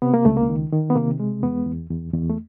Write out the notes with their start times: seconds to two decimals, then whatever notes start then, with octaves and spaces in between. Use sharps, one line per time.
0.02 C3 B3
0.14 A#3
0.25 C#2 A3
0.37 A#3
0.49 D#3
0.73 D#3
0.90 B3
0.96 C3 A#3
1.20 G#3
1.43 E2 B3
1.66 E2
1.90 E2
2.13 E2
2.30 A3